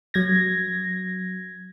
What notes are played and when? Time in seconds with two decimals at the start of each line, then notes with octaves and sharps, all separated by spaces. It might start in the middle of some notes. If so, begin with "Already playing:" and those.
0.14 F#3 G#6 A#6